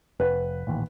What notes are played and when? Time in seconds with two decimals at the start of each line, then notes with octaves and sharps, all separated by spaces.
0.20 F1 B4
0.67 D#1 A1 D#2